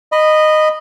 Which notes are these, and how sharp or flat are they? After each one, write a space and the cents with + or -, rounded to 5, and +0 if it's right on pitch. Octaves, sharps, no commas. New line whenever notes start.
D#5 -10 B5 +0